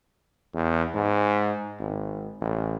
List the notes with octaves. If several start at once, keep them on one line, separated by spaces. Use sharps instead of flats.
E2
G#2
G#1
A1